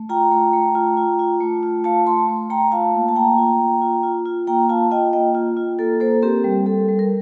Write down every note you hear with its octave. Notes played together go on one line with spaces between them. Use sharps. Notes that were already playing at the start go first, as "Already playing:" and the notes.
Already playing: A3
F4 G5 A#5
A3
A3
F4
F4
F4
A3
F4
A3 F5 A5
A3 A5 C6
A3
A3 G5 A#5
F4 F5 A5
A#3
A5
A#3 G5 A#5
F4
A#3
F4
F4
F4
A#3 G5 A#5
F4 F5 A5
F4 D#5 G5
A#3 D#5 G5
F4
F4
A#3 A4
A#3 A4 C5
C4 G4 A#4
G3
G3 A4
G3
A#4